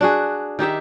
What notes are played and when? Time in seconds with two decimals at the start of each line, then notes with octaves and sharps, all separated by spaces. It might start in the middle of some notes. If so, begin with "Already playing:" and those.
0.01 D4 F#4 G#4
0.59 D#3 D#4 G4 E5